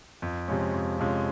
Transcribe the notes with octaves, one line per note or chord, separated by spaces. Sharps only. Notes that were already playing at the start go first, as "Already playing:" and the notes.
F2
C3 F3 G#3 C#4
F2
C3 F3 G#3 C#4